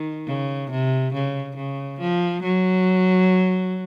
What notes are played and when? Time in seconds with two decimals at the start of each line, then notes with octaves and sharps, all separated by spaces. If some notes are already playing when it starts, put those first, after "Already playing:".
Already playing: D#3
0.27 C#3
0.71 C3
1.14 C#3
1.56 C#3
2.00 F3
2.43 F#3